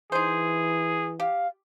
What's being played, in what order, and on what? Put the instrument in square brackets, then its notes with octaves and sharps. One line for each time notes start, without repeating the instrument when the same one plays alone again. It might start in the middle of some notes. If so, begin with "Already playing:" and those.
[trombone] E3 [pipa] D#4 C5 [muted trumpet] G#4
[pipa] G4 [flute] F5